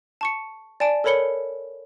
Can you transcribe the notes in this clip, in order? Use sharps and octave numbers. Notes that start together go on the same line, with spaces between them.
A5 C#6 C#7
D5 G#5 A5 D7
A4 A#4 C#5 B5 C#7 G7